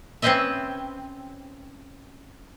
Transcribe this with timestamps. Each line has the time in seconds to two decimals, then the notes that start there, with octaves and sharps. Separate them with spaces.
0.22 C4 C#4 B4 C5 D#5 E5